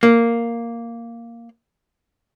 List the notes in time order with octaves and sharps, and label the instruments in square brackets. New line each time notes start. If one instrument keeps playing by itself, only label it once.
[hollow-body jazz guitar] A#3